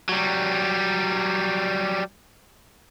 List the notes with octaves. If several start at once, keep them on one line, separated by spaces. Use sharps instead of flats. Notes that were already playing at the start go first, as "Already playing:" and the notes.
F#3 G3